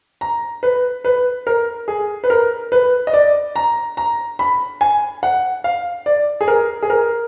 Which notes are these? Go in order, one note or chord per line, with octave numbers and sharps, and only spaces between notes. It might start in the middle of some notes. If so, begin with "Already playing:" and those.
A#5
B4
B4
A#4
G#4
B4
A#4
B4
D#5
D5
A#5
A#5
B5
G#5
F#5
F5
D5
G#4
A#4
G#4
A#4